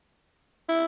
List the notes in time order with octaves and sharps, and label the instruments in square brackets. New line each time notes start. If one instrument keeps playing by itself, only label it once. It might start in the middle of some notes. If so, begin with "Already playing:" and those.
[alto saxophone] E4